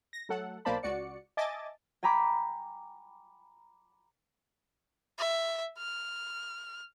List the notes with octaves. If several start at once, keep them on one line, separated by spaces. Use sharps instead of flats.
A#6
F#3 A3 A4 F#5
B1 A#3 C5 D5 A5 B5
C#2 F#4 D5 C#7
D#5 E5 G#5 A5 D6 A6
G5 G#5 A#5 B5 D6
E5
F6